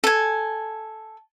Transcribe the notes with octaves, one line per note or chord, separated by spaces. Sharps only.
A4 G#5